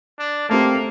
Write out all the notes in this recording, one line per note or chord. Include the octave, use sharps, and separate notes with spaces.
D4
A3 A#3 C4 G4